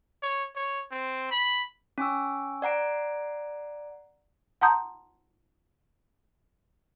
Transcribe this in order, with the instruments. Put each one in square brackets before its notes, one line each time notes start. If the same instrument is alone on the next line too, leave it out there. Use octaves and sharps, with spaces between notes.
[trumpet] C#5
C#5
C4
B5
[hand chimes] C#4 G#5 C#6 E6
D5 F#5 A#5 D7
[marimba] F#5 A5 A#5 C6 D#6 G6